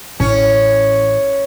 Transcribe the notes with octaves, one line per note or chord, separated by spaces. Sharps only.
A1 C#4